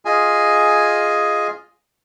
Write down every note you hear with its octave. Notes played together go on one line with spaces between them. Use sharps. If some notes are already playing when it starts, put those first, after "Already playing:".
F4 G#4 D#5 G#5